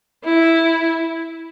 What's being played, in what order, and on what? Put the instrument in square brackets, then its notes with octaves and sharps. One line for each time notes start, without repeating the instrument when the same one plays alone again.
[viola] E4